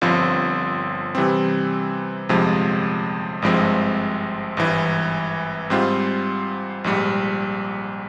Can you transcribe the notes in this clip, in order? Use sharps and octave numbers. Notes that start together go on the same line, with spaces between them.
G1 G2 F3 C4 F4
C3 E3 G3 C4
G1 F2 C3 F3 G#3
G#1 G2 F3 G#3 C4
G#1 G2 E3
G#2 G3 C4 F4
A#1 G#2 G3